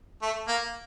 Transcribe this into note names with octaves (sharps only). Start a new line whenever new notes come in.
A3
A#3